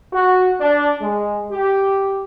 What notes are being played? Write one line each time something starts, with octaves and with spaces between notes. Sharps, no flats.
F#4
D4
G#3
G4